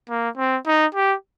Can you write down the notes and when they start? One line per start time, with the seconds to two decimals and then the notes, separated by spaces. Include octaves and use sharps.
0.09 A#3
0.37 C4
0.66 D#4
0.95 G4